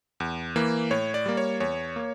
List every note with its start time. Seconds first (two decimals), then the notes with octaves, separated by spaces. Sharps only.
0.20 E2
0.56 E3 A#3
0.91 A2 C#5
1.14 D5
1.26 G3 A#3
1.37 C#5
1.60 E2 C#5
1.96 A#3